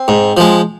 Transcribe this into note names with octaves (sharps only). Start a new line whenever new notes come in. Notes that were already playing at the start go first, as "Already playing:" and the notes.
Already playing: C4
G#2
F3 G#3